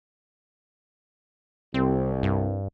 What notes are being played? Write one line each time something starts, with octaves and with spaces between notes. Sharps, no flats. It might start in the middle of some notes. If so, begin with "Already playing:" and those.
C2 C4
G2